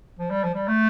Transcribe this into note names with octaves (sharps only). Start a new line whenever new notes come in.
F3
G3
F3
G3
A3